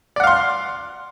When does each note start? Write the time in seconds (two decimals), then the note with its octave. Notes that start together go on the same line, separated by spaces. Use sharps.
0.16 D5
0.20 F#5
0.24 F5
0.27 C6